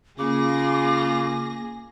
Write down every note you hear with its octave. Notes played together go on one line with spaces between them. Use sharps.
C#3 A#3 F4 G#4 D6 A#6